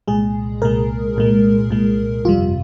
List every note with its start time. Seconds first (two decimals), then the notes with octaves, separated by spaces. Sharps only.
0.08 C2 A#2 G#3 G#4
0.62 C2 A#2 G#3 A#4
1.16 C2 A#2 G#3
1.70 C2 A#2 G#3
2.25 G1 F2 C3 G3 F4